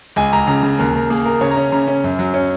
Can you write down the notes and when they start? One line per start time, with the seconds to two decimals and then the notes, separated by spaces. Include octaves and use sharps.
0.16 C#2 G#5
0.33 C#2 A#5
0.47 C#3 A#5
0.63 C#3
0.79 D#2 A#4
0.94 D#2 A#4
1.10 A#3 G#4
1.26 A#3 A#4
1.41 C#3 C#5
1.51 A#5
1.57 C#4
1.72 C#3 A#5
1.88 C#4
2.04 F#2
2.19 F#3
2.34 C#4